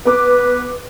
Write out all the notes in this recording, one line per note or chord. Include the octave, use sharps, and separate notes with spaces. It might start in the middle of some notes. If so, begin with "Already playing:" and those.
B3 B4 D6